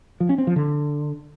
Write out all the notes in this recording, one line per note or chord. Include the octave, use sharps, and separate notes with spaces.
F3
C#4
C4
F3
D3